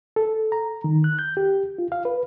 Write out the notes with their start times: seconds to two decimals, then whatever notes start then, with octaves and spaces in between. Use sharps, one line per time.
0.16 A4
0.52 A#5
0.84 D#3
1.04 F#6
1.19 G6
1.37 G4
1.79 F4
1.92 F5
2.05 B4